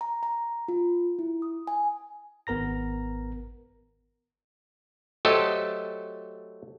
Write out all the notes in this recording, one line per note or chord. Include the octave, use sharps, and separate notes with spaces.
A#5
A#5
F4
E4
D#6
G#5
G#1 B3 A#4 A#5 A#6
F#3 A3 G4 A4 C5 D#5